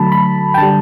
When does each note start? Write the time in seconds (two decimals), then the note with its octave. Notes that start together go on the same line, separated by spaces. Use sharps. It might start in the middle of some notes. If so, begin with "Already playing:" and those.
Already playing: D3 F#3 A3 A5 B5
0.12 B5
0.54 G5
0.58 D3 G3 A5